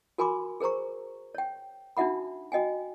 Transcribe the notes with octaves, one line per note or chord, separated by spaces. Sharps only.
F#4 A#4 G#5 B5 C6 D6
G#4 A#4 C5 A#5 C#6
C#5 G5
D4 D#4 F#4 E5 F#5 B5
F#4 D#5 G5 G#5